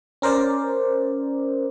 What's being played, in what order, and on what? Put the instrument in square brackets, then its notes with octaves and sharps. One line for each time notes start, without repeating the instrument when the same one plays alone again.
[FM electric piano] C#4 A#4 C5 D5